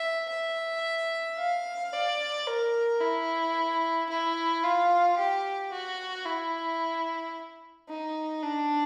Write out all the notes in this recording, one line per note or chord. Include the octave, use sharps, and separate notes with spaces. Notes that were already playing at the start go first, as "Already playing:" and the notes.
Already playing: E5
E5
F5
D5
A#4
E4
E4
F4
G4
F#4
E4
D#4
D4